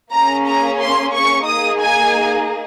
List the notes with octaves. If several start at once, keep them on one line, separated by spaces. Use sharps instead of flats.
A#3 C#4 G#4 A#5
A#5
C6
C#6
A#3 D#4 G#4 D#6
G#5